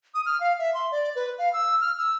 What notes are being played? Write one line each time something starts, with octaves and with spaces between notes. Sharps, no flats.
D#6
F6
F5
E5
C6
D5
B4
F5
E6
F6
E6